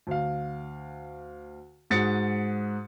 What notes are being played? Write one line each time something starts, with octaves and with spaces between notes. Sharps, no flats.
D2 F5
G#2 F#4 D#6 A6 C#7